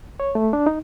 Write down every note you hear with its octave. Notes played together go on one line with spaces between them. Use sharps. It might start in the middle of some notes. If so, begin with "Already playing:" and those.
C#5
A3
D4
D#4